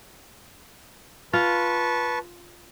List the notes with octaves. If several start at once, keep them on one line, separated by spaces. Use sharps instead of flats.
F4 B4 A5 C#6